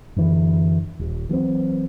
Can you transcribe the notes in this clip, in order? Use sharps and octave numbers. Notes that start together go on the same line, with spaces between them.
F#2 D3 E3
D#1
E3 F#3 G#3 C4